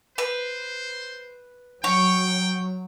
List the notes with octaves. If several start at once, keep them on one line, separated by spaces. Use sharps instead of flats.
B4 C5
F#3 C#5 G5